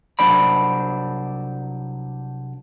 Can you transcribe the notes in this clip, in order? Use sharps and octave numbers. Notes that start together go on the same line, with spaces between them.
C2 F#3 D4 C5 D5 B5